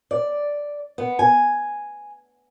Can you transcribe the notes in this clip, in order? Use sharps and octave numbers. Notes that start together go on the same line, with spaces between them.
D5
B3
G#5